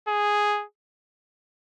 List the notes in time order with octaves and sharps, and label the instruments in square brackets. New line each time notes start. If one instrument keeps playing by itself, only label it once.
[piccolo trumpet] G#4